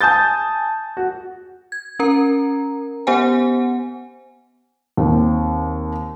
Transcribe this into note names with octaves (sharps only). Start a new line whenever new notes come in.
G#5 A5 D#6 G6 A6
F#4
G#6
C#4 A#4 A#5
B3 G4 C5 F#5 G#5
D#2 C4